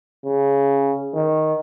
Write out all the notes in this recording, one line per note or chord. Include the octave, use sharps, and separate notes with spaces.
C#3
D#3